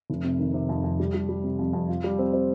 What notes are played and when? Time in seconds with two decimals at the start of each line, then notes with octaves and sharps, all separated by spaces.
0.10 F1
0.24 C3
0.39 D#3
0.54 C3
0.69 F2
0.84 F2
1.00 G3
1.14 G3
1.29 G3
1.44 C3
1.59 F2
1.73 F2
1.88 F4
2.04 G3
2.19 C4
2.33 C4